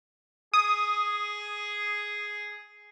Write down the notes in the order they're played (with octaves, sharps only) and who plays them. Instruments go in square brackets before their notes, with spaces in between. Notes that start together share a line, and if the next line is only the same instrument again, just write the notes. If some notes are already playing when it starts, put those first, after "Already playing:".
[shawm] G#4 [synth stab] D#6